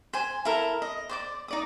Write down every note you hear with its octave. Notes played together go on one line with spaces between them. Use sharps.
C5 G#5
E4 A4 A#4
D#5
C5 D5 D6
D#4 D5 D#6